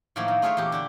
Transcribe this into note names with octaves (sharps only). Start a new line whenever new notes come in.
A2 D#3 F3 F#3 A#3 E4
D#3
A3 F4 G#4 A#4 C#5 E5
E2 A#2 G4
D3 D4 G5